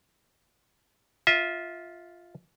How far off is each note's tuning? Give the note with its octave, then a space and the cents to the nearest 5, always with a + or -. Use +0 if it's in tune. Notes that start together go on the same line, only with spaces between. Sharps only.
F4 +0 E5 -25